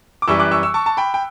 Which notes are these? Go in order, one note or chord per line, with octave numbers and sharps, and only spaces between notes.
D6
F#2 E3 G3 C#6 E6
D6 F#6
C#6 E6
C#6 E6
A5 C#6
A5
G5 B5
G5